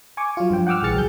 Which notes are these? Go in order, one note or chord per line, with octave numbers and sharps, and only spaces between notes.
G#5 C#6 D6
F#3 F4
G2 F3 G5
F#5 G5 D6 E6 F6
A#1 E3 G#4 F6 A6 C#7
C#2 F#3 G#4 G6